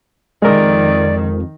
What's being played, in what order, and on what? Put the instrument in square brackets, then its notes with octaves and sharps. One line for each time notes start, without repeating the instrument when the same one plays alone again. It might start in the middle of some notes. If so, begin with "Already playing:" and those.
[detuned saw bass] F2 [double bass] D#3 [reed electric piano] G#3 A#4 [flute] D5